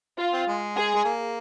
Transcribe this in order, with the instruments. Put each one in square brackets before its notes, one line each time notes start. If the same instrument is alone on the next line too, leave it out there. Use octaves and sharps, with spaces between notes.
[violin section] F4
[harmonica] C4
G#3
[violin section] G#4
[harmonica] G#3
A#3